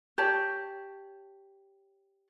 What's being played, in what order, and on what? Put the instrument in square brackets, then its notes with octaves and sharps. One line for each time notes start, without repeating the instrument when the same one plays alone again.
[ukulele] G4 C#5 A5